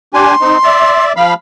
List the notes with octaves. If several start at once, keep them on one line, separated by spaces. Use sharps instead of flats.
D4 G4 G#5 C6
C4 D#4
D5 E5
F3 F5 B5